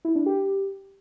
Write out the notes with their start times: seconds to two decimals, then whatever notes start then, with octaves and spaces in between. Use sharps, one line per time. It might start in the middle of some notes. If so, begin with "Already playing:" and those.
0.05 E4
0.15 D4
0.26 G4